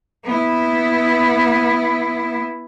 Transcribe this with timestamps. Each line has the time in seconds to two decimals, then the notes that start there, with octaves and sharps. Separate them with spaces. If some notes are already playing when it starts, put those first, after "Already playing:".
0.24 B3 E4